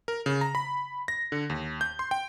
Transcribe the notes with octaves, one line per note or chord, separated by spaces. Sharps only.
A#4
C#3
A#5
B5
A#6
D3
D#2
G6
C6
G5